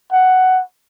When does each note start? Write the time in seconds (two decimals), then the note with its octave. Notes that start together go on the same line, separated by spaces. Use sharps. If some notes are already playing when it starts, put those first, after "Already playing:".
0.13 F#5